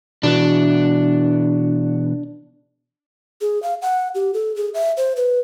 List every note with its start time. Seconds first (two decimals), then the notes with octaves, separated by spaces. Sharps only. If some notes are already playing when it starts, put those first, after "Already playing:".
0.23 B2 E3 D4 F#4
3.41 G#4
3.63 F5
3.82 F#5
4.15 G4
4.34 A4
4.56 G#4
4.74 E5
4.97 C5
5.16 B4